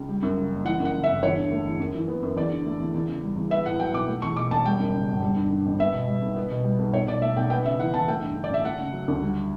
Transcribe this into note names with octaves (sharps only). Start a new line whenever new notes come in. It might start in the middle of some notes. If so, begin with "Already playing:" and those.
Already playing: C#2
G3
F#2
C#3
F#1
E3 F#5
F#2
F#5
C#3
E5
G1
E2 C#5
D3
A3
E2
F#2
E3
B3
F#2
E2 D5
D3
A3
E2
E2
C#3
G3
E2
B3 E5
A2 F#5
F#3 G5
B1 D6
A3
E2 C#6
B2 D6
E1 A5
G3 G5
F#2
C#3
G1
G3
G2
D3
A1
B3 E5
B2
G3
B1
B3
B2
G3
B1
B1 C#5
B2 D5
A3 E5
B1 G5
B3 G5
C#3 E5
E3 F#5
E2 A5
A3 G5
G2
D3
D5
A1 E5
A3 F#5
C#3
F#3
D2
G3